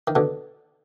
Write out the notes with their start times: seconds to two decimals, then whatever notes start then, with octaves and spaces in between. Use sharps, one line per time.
0.08 D#3
0.15 B2 D3